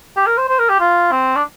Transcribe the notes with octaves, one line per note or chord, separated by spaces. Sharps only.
G4
A#4
C5
C5
A#4
G4
F4
C4
D4